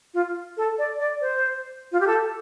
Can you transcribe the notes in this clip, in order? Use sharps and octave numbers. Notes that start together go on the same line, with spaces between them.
F4
A4
D5
D5
C5
F4
G4
A4